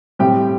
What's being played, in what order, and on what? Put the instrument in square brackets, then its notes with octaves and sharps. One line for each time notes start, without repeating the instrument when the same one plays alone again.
[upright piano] A2 G3 C4 G4 G5